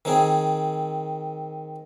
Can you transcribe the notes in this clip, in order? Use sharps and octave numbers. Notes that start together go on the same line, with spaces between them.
D#3 C4 G#4